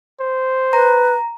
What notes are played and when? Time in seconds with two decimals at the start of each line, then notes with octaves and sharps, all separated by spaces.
0.20 C5
0.73 B4 A#5